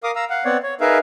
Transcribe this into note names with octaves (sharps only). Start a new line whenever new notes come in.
A#4 F5 D6 D#6
F5 A#5 E6
F5 F#5
B3 C4 C#5 D5 F#5
C#5
D#4 G#4 A#4 B4 E5 F5